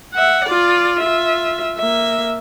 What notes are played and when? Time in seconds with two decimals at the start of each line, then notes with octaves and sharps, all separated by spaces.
0.14 E5 F#5
0.45 F4 D5
0.99 F4 E5
1.77 A#3 E5